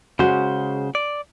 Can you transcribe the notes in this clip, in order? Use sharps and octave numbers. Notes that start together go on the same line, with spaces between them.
C#3 G#3 C#4 F#4 C5
D5